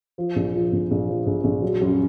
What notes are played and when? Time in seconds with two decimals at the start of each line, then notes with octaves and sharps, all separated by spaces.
0.18 F3
0.36 A#1
0.55 F3
0.73 A#1
0.91 A#1
1.09 F3
1.27 A#1
1.44 A#1
1.62 F#3
1.81 F#2